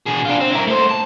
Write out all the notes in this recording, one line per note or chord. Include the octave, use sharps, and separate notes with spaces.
B2 G#4
D4 F4
C4
E4 A#4
A3 C5
A5